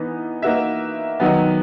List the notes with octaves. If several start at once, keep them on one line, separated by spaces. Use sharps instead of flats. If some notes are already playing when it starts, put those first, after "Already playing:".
Already playing: E3 B3 D#4
A#3 D#4 F#4 B4 E5
D#3 F#3 B3